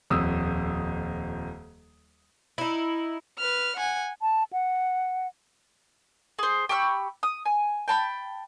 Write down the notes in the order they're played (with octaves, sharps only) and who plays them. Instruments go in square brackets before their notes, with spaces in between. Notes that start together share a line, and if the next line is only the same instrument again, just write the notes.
[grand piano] D#1 F2 D#6 E6
[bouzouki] D#4 E4
[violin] B4 F6
F#5 G#5
[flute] A5
F#5
[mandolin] G#4 C5
G4 B5 C#6 E6
D#6
G#5
G5 A5 B5